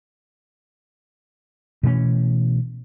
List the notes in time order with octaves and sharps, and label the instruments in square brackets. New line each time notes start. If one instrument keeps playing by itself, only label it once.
[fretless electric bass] B2 E3 A3 C#4